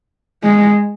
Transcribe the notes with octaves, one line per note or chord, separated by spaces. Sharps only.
G#3